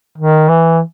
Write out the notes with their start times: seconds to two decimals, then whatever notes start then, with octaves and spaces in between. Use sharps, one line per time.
0.18 D#3
0.49 E3